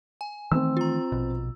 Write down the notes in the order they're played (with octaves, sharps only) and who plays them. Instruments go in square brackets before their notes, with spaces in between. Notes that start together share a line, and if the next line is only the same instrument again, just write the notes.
[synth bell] G#5
[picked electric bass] D#3 E3 A3 [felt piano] C4 E6
[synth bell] F4 A#5
[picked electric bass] A#1 B2